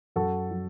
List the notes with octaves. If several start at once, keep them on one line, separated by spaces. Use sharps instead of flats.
F#2 F#4 A4
F#3